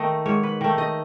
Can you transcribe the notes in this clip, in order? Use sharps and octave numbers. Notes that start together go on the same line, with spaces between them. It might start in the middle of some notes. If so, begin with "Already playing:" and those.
Already playing: D#3 A3 D#5
G#2 C#5
B4
D#3 A3
D#5